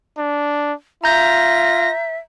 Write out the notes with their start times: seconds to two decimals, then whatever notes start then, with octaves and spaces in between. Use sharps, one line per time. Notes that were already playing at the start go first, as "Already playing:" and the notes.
0.18 D4
1.04 F4 E5 A#5 G6 A#6